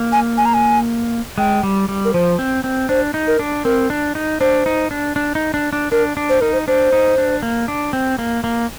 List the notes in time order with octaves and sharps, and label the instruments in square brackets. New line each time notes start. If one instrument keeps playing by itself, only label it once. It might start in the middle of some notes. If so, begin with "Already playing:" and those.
Already playing: [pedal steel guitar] A#3
[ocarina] G#5
G#5
A#5
G#5
[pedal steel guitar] G#3 [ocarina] G5
[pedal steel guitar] G3
G3
[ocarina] A#4
[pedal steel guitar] F3 [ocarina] C5
[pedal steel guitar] C4
C4
[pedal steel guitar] D4 [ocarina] C5
[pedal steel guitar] D#4
[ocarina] A#4
[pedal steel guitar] D4
[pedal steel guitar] C4 [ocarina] A#4
[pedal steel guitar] D4
D#4
[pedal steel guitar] D4 [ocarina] C5
[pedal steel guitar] D#4
D4
D4
D#4
D4
D4
[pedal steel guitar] D4 [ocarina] A#4
[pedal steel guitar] D4
[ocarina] C5
[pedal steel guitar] D#4 [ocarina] A#4
[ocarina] C5
[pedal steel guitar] D4 [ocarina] C5
[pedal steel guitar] D#4
D4
A#3
D4
C4
A#3
A#3